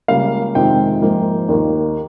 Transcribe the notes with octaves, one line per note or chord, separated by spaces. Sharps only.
C#2 C#3 G3 A#3 F5
F2 C3 D#3 G#3 G5
G#2 F3 A#3
D#2 D#3 A#3